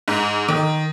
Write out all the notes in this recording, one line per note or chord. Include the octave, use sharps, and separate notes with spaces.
G#2
D#3